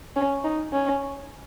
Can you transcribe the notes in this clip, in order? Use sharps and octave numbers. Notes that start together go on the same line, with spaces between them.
C#4
D#4
C#4